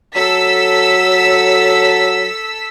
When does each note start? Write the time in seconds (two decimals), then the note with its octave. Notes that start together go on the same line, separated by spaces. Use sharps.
0.16 F#3 A4 E6 B6